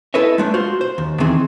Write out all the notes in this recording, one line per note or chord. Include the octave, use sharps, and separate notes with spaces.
E4 A4 B4 C#5 D#5 E5
G#3 A3 D4
F4 F#4 C5
C5
D#2
D#3 E3 C4 G#4